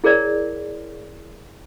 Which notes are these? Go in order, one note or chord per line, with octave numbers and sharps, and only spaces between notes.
E4 G#4 A#4 C#5 D5